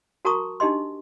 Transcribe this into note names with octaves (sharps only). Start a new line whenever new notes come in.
F#4 A#4 A5 A#5 C#6 D#6
D4 D#4 G4 D#5 C6